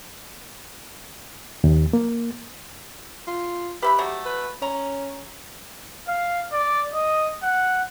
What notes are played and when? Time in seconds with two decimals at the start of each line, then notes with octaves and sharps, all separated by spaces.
1.64 D#2
1.93 A#3
3.27 F4
3.82 G4 B4 E5 B5
3.98 F#3 A3 F#4
4.25 B4
4.62 C#4 A#5
6.08 F5
6.52 D5
6.94 D#5
7.43 F#5